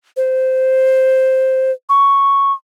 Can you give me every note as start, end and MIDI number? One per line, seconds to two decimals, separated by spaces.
0.17 1.72 72
1.89 2.53 85